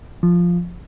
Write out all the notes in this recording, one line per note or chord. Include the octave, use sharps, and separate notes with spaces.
F3